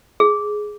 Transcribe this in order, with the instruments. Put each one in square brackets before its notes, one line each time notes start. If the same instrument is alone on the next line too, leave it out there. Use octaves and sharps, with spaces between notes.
[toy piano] G#4